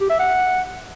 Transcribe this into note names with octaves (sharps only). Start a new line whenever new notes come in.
G4
E5
F#5